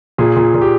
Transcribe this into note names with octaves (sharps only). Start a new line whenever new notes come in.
A#2 G#4
A#2
A#2
G4